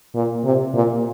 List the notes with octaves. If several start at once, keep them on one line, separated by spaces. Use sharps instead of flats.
A#2
C3
A#2